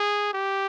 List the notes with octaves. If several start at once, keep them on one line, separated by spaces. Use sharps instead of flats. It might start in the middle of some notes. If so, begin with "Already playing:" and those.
Already playing: G#4
G4